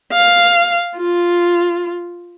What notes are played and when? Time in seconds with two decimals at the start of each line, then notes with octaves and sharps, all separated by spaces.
0.12 F5
0.98 F4